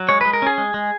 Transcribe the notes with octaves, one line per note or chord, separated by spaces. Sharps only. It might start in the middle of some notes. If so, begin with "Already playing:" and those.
Already playing: F#3
G#3 C#5
G#3 B4
A#4
C#4 G#4
G#3
G#3